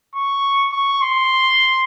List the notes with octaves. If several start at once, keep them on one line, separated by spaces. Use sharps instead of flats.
C#6
C#6
C6